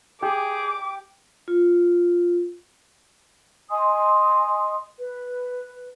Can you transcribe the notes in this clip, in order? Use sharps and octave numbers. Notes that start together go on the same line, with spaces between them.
G4 G#4 D6
F4
D#5 G#5 C6 D#6
B4